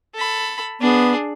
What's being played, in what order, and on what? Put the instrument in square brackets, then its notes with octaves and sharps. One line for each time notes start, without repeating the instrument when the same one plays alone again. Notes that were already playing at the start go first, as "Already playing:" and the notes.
[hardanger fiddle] A4 B5
[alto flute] B3 [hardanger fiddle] D4 G#4